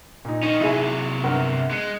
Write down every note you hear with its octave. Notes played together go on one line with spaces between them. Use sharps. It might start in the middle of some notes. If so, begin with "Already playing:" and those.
A#2 D#4
D#3 C#4 D#4
C3 F#3 E4 G#4 D#7
G1 A#4 F#5
G#3 F#6 C#7